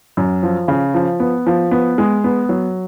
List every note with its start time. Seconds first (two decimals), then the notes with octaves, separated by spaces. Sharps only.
0.17 F#2
0.43 F3
0.68 C#3
0.94 F3
1.20 B3
1.47 F3
1.71 B3
1.98 G#3
2.24 B3
2.49 F#3